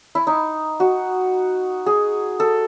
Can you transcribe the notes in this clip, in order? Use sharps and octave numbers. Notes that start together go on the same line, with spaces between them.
E4
D#4
F#4
G#4
A4